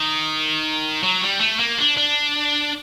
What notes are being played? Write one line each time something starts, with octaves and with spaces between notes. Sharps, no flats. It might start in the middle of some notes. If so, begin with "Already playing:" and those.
Already playing: D#3
F#3
G3
A3
A#3
D4
D4